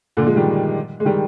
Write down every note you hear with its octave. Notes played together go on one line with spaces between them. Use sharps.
A#2 D3
F3 G#3
D#3 G3
G#3
D#3 G3